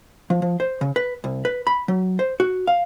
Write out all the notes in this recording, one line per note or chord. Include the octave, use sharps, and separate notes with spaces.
F3
F3
C5
C#3
B4
C2
B4
B5
F#3
C5
F#4
F5